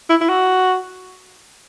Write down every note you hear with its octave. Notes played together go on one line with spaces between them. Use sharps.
E4
E4
F#4